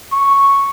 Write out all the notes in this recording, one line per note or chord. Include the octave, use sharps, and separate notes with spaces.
C#6